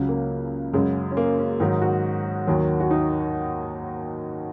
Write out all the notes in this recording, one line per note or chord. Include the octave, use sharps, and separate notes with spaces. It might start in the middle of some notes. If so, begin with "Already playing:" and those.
Already playing: C#2 C#3 F#3
A#3
F#2 C#3 F#3 G#3
C#4
A#3
C#4
G#2 D#3 F#3 D#4
F#4
D#2 D#3 F#3
F#4
D#4